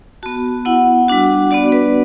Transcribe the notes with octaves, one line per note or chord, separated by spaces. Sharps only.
B3 F#4 A5
B3 E4 F#5
G3 D4 F#4
B3 D4 F#4 D5
B4